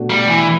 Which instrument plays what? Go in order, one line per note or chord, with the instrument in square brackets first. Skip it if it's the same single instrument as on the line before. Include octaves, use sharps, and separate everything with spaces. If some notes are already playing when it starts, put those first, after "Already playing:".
Already playing: [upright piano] B2 A3 D4 F#4
[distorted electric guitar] G3
E3